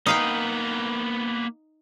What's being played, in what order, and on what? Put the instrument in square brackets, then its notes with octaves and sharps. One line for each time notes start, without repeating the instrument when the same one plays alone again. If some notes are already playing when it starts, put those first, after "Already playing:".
[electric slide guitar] A#3 B3 B4 [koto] D#4 F5 G5